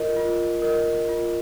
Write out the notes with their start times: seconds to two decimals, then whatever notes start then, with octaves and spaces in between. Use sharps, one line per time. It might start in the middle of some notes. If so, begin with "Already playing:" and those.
Already playing: F4 A#4 D#5
0.17 F4
0.62 A#4 D#5
1.09 F4